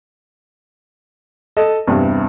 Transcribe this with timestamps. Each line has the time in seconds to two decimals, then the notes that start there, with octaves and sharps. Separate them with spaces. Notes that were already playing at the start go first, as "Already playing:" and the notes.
1.57 A4 D#5
1.87 E2 G2 C3